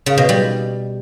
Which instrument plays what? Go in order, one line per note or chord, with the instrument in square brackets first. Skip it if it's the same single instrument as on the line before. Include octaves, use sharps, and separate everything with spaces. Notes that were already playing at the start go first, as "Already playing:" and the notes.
[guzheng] C#3
B2
G3